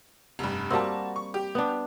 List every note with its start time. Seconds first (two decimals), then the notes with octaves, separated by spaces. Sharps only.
0.39 F1 G2
0.70 G3 A#3 C4 F#4 A5
1.16 C#6
1.34 G4
1.55 B3 D4